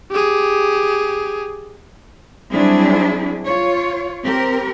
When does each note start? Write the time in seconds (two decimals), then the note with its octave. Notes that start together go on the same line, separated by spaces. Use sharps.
0.10 G4 G#4
2.52 F#3 G3 C4 D4 E4 G#4
3.44 F4 C#5
4.24 C4 G4 A#4